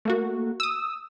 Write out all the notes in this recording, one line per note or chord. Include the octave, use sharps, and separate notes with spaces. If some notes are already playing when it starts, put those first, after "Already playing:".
A3 A#3 F#4
D#6 E6